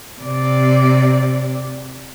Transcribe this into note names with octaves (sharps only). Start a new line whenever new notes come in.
C3 D5